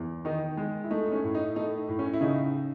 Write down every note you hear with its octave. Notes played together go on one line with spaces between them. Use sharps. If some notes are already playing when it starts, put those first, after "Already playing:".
Already playing: E2
D#3 D#4
G#3
E4
A3 D#4
D#4
C#4
A2
D#4
A3 D#4
A2
C#4
E4
C#3 D#4